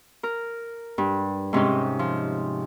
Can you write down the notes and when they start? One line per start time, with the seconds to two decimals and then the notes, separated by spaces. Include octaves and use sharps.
0.23 A#4
0.98 G2
1.53 G#2 C3 C#4 D#4
1.99 F3